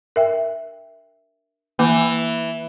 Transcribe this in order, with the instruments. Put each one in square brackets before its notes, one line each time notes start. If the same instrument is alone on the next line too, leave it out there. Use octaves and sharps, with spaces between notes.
[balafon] A#4 E5 G5
[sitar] E3 [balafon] A#3